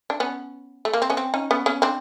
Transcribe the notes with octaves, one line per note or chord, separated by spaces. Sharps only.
D4
B3 C#4
A3
A#3
C4
B3 C#4
C4
C#4 D#4
B3 C#4
B3 C#4
C4 D4